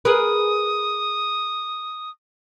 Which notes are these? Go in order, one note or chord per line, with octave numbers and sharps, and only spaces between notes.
G#4 A#4 B4 D#6